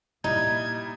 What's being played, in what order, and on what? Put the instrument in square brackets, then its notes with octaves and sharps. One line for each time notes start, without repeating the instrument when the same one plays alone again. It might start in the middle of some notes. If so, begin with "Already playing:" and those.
[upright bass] A#2 [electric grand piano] G3 E4 [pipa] D#4 [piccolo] G#6